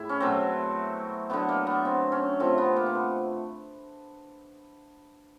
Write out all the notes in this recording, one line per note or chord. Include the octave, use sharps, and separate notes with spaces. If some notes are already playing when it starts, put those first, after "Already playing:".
Already playing: A2 G#3 E4
C#4
B2 F#3 A3 C4
D3 F#3 A3 B3
A#3
B3
C4
C#4
C3 F3 A3 C4
B3
A#3
C4
B3